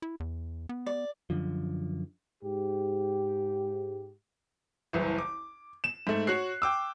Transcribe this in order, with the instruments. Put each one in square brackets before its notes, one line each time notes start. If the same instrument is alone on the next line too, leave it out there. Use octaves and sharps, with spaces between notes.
[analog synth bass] E4
E2
B3
[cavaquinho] D5
[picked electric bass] F#2 D3 F3
[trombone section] G#2 G4
[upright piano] F#1 C2 E3
D6
E7
G#2 A3
F#4 C#5 F#6 C7
G5 D6 E6